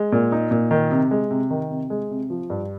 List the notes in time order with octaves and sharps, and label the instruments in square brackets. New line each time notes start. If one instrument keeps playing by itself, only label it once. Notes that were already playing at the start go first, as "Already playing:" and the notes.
Already playing: [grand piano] G#3
A#2
D#4
A#2
D#3
C3
G#3
C3
D#3
C3
G#3
C3
F3
G2